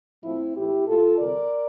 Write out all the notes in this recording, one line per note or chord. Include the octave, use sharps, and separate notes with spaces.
A2 F3 A3 C4 E4
A2 E3 A3 E4 G4
A#2 A3 F4 A4
D2 C3 G3 A#4 D5